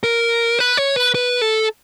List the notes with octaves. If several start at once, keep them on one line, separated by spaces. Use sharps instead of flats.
A#4
B4
C#5
B4
B4
A4